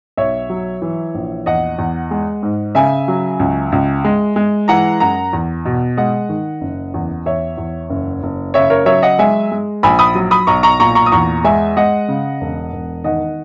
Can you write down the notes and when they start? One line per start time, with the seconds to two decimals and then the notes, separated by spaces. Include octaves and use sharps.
0.17 B1 C#5 E5
0.50 F#3
0.82 E3
1.14 A#1
1.46 E2 D#5 F#5
1.78 E2
2.11 G#3
2.43 G#2
2.75 C#3 E5 G#5
3.08 F#3
3.40 C#2
3.72 C#2
4.05 G#3
4.36 G#3
4.68 E3 F#5 A#5
5.00 F#2 F#5 A#5
5.33 E2
5.65 B2
5.97 G#3 D#5 F#5
6.29 D#3
6.61 F#1
6.94 E2
7.26 E2 C#5 E5
7.57 E2
7.90 F#1
8.23 F#1
8.54 C#3 C#5 E5
8.70 A#4 C#5
8.86 F#3 C#5 E5
9.02 D#5 F#5
9.19 G#3 E5 G#5
9.52 G#3
9.83 A#1 G#5 B5
9.99 B5 D#6
10.15 F#3
10.31 B5 D#6
10.47 B1 A#5 C#6
10.63 A#5 C#6
10.80 A#2 A#5 C#6
10.95 A#5 C#6
11.06 D#6
11.12 E2 A#5 C#6
11.44 G#3 E5 G#5
11.77 G#3 D#5 F#5
12.08 C#3
12.41 E1
12.72 E1
13.04 D#3 D#5 F#5